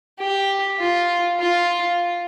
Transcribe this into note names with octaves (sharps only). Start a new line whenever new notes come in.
G4
F4
F4